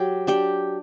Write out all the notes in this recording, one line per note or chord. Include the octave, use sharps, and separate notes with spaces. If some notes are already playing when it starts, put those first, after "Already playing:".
Already playing: F#3 G4 G5
D4 G4 G5